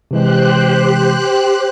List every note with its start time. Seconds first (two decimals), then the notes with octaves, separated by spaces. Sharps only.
0.11 C3 E3 G#3 G4 C5 F#6